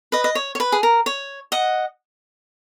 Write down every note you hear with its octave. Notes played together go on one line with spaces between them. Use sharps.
B4 D#5
D#5
C#5
C#5
B4
G#4
A#4
C#5
D#5 F#5